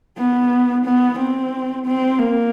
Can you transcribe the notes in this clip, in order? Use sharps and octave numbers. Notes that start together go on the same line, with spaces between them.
B3
B3
C4
C4
A#3